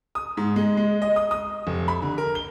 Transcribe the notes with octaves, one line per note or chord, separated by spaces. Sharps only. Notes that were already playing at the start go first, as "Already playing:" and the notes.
D#6
G#2
G#3
G#3
D#5
D#6
D#6
F1
B5
D3
A#4
G7